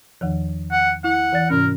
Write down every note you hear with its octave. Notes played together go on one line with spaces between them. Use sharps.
E2 D#3 F3
F#5
E4 F#5
E3 D5 A6
G#2 C3 C#4 A#4